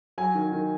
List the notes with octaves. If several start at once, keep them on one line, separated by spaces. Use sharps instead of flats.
F#3 G#5
D#3
D#3